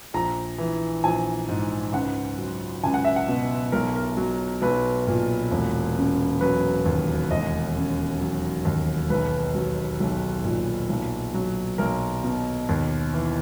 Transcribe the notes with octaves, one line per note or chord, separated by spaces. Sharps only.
A#1 A#5
E3
A#1 G#5
G#2
C#2 F#5
F#3
C#2 G#5
F#5
E5
F#5
B2
B1 A#4
A#4
F#3
B1 B4
A#2
E1
C#3
F#3 B4
D#2
E1 D#5
C#3
F#3
D#2
B1 B4
F#3
B1
A#2
B1
F#3
B1 A#4
B2
D#2
E3